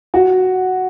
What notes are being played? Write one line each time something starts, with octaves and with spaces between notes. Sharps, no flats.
F#4